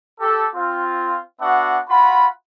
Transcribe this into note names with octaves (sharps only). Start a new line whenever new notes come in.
G4 A4
C4 F4
B3 D4 F#4 E5 F#5
F4 F#4 F#5 B5